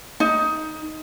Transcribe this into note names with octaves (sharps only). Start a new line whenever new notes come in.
D#4